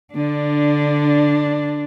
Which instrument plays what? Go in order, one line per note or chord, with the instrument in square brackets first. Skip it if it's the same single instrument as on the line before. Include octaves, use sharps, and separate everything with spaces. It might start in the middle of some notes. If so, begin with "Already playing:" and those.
[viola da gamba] D3 [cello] D4